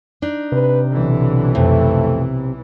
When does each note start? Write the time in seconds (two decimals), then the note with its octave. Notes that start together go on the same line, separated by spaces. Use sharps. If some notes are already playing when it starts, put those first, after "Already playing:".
0.22 D4 D#4
0.52 C3 B4
0.92 B1 D3 E3
1.55 F2 A3